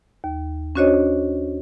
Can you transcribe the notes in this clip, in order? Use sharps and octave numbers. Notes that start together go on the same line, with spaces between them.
D#2
C#4 D4 F#4 C5 C#5 D#5